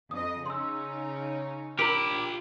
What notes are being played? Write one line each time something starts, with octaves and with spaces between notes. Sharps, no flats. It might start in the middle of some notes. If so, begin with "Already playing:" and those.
F2 D#5 D#6
C#3 C#4 D#4 C6 E6
F4 G4 A#4 A#5 B5